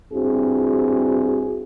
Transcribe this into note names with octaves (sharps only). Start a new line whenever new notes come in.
G2 C4 E4 F#4 G#4